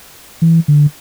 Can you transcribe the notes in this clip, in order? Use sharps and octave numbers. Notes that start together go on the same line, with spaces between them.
E3
D3